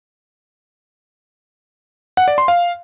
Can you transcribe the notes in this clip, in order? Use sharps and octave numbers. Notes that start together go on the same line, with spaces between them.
F#5
D5
C6
F5